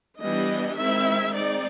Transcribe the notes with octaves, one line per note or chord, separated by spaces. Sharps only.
E3 G3 B3 D4 D#5
D#3 G#3 C4 E4 E5
G#3 C4 D#4 D5